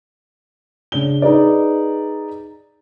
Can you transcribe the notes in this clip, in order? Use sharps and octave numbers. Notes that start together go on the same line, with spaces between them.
C#3 D4 G7
D#4 G#4 B4 D5